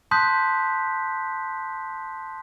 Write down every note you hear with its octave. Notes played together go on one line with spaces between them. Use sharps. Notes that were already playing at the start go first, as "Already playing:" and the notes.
A5 C6 D#6 F#6 G6 B6